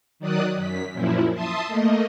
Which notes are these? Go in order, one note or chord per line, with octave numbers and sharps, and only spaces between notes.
D#3 F#3 D5 D#6 F#6
F#2 B6
F#2 A#2 F3 E4
E5 A5 C6 D#6
A3 A#3 D#5